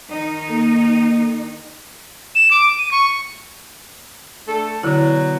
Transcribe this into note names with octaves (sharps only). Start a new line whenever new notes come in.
D#3 D#4
A#3 A4
E7
D6
D#7
C#6
A3 D4 A4
B2 D3 F#3 E4